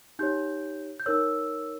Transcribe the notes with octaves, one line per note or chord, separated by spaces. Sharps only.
D#4 G4 C#5 G6
G6
D#4 A#4 C#5 E6